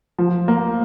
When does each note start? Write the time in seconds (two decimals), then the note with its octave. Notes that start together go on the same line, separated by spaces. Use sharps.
0.19 F3
0.48 A#3